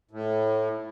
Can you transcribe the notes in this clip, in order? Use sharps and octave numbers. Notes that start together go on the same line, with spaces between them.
A2